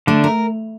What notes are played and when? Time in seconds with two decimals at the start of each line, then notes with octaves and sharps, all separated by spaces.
0.07 D3 A3 D4
0.24 A#4